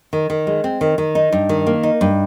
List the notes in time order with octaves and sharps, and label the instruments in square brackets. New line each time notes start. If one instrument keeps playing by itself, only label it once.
[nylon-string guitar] D#3
D#3
G#3
C4
D#3
D#3
D#4
G2
D#3
A#3
D#4
G2